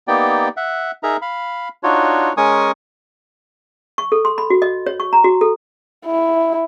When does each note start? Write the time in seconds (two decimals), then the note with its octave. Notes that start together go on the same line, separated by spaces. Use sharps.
0.08 A#3 B3 D#4 G4 D5 G5
0.57 E5 F#5
1.03 D#4 G#4 A#4 E5 A#5
1.22 F5 B5
1.83 D4 D#4 F4 F#4 C#5
2.37 G#3 C#4 A#4 G#5 C#6 D#6
3.98 C#6
4.12 A4
4.25 C6
4.38 B5
4.50 F#4
4.62 D#5
4.87 C#5
5.00 C#6
5.13 A#5
5.24 F#4
5.41 A4
6.06 E4